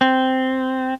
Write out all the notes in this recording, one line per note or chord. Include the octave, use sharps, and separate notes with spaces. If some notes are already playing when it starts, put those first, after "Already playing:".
C4